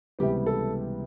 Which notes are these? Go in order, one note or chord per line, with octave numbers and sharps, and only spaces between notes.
C#2 C3 E3 G3 B3 G4
A4